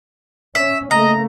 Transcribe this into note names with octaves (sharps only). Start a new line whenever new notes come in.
C#4 E5
C#3 A3 A#3 D#5 A#5